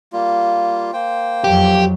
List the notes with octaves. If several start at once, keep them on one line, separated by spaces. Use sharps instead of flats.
G3 A#3 F4
A#3 C5 G5
F2 F#3 G4